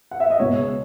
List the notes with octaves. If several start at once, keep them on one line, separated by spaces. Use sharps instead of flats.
F#5
E5
D#5
C#2 B2 G#3 C#5